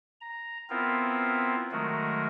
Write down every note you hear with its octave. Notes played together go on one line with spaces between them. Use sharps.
A#5
B3 C4 E4 F4 A#4
D#3 F#3 G#3 A3 F#4 A#4